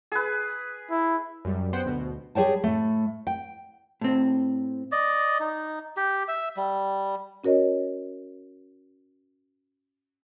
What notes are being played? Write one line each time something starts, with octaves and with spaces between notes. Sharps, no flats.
G#4 B4
E4
F#2 G3
B3 C5 F#5 G5
D2 B2
G3 G#4 C#5 G5 A5
A2 A3
G5
A2 C4
D5 D#5
D#4
G4
E5
G3
C#4 F#4 A#4 C#5 D#5